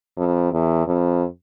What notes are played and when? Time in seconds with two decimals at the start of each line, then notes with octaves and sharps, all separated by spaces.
0.17 F2
0.52 E2
0.87 F2